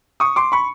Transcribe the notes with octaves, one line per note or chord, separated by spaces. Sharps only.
C#6 D#6
C6 D6
B5 C#6